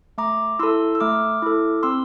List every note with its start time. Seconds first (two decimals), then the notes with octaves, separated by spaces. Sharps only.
0.18 A3 A#5 D6
0.59 E4 A4 C6 E6
0.95 E6
1.00 A3 D6 F6
1.42 E4 A4
1.83 C4 C6 E6